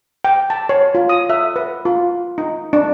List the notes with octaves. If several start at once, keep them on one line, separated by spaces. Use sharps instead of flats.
G5
A5
C#5
F4
D#6
E5
B4
F4
D#4
D4